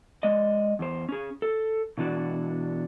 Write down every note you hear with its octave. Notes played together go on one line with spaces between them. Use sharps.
G#3 D5 D#5
E2 C5
C#4 G#4
A4
B2 E3 D4 F#4 D5